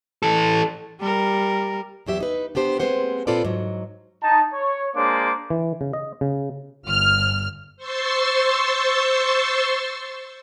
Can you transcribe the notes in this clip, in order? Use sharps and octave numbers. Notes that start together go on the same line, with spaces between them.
E3 A4
G3 A#4
E2 F#3 G4 E5
D#4 B4
B3 D4 G4 C5
G#3 A#3 C4 B4 C5 F#5
A#2 C4 F4 A4 B4 D5
G#2 F#3
D#4 A5
C#5
G#3 A#3 D4 C5 D6
E3
C#3
D#5
C#3
G1 F6
C5 C6 C#6 E6 A6 C7